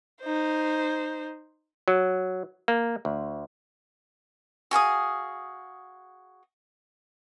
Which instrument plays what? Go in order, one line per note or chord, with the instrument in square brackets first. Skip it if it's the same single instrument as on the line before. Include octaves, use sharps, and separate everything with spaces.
[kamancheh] D#4 C5
[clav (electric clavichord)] F#3
A#3
D2
[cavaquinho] F#4 G#4 F5 D#6